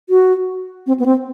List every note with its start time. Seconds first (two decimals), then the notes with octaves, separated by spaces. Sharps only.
0.10 F#4
0.87 C4
1.00 B3
1.06 C4